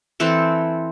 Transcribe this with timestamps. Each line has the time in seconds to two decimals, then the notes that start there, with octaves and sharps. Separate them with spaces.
0.20 E3 C4 A4